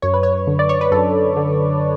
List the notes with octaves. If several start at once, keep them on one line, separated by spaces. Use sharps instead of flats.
F#2 C#5
B4
C#5
D3
D5
C#5
B4
F#2 A4
D3